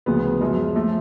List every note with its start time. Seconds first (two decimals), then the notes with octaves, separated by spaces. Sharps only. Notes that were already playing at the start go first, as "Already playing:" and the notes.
0.06 D2 C#3 F3 B3
0.41 F#2 F3 G#3
0.76 F3 A3